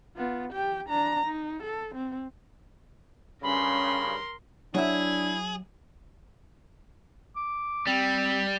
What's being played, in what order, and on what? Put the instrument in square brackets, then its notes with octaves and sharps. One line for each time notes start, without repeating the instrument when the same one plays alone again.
[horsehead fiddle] B3 F4
G4 G5
D4 A#5
D#4
A4
C4
[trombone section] G2 C#3 [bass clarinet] C#4 [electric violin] A#4 C6 [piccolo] B5
[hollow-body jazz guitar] F#3 E5 [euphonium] D4 [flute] E4 [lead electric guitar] G#4
[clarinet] D6
[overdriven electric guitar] G3 [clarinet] C4